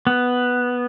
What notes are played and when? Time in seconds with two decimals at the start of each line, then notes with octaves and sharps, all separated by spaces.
0.07 B3